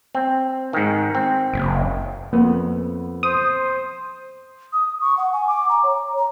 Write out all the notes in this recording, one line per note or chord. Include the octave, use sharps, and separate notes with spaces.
C4
G#2 D#3
C4
F#1
F2 A#3 B3
C5 D#6
D#6
C#6
F#5
G#5
D6
A#5
C#5
A#5